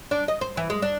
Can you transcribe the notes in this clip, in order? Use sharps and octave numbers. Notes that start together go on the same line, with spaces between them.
D4
D#5
C5
E3
G#3
D4